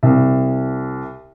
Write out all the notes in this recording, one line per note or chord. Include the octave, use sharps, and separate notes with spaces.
C2